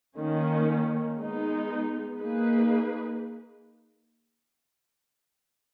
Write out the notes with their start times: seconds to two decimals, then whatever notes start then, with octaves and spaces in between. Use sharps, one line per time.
0.17 D#3 A#3 C#4
1.18 G#3 B3 D#4
2.19 A#3 D#4 G#4 B4